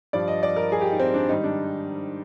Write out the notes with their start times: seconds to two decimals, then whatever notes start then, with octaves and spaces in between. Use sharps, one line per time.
0.13 G2 F3 D5
0.28 D#5
0.43 D5
0.56 A#4
0.72 G#4
0.81 G4
0.91 D#4
1.00 C4
1.14 D4
1.29 G#2 D#3 G3 D#4
1.44 D4